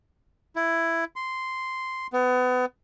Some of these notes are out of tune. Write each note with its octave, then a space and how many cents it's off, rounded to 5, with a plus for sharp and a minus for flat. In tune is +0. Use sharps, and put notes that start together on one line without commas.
E4 +10
C6 -5
B3 +30